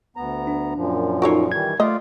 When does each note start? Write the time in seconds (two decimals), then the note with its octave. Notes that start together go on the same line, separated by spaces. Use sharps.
0.17 D2 B3 A#5
0.47 D4
0.77 F#2 A#2 F3
1.22 D#4 F4 F#4 A4 C#5
1.52 D#3 E3 G3 G#6
1.80 A3 F4 D5 D#5 F5